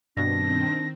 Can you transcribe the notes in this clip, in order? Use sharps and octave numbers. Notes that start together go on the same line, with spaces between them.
G2 B2 D#3 C4 D4 A#6